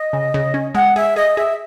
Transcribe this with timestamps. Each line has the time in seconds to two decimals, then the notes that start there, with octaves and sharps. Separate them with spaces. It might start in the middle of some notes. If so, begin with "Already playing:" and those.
Already playing: D#5
0.13 C#3
0.34 C#3
0.54 C#4
0.75 G#3 F#5
0.96 G#4 E5
1.16 G#4 D#5
1.37 G#4 E5